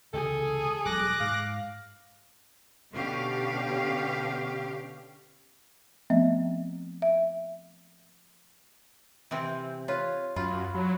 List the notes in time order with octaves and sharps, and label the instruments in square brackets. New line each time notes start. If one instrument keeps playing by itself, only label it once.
[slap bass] C#2 C3 E3 [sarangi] G#4 [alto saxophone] A4
[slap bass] E1 F#3 G3 [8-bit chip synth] D6 F#6 A#6
[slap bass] G#2 [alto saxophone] F5
[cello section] B2 D3 C#4 G4 F5
[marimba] F3 A3 B3 C4 D#5 E5
E5
[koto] C3 E3 C4
[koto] F4 B4 [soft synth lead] C#5
[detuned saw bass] F#2 [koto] F4 [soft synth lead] B5
[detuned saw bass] F#3